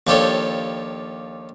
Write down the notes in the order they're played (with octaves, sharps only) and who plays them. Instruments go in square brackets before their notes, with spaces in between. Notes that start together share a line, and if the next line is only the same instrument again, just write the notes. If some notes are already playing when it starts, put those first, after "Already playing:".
[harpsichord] D#2 F3 D4 G4 A4 C#5